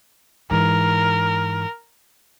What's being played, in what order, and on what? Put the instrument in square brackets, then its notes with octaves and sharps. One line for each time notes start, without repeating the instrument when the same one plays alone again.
[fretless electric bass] G#2 E3 [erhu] A#4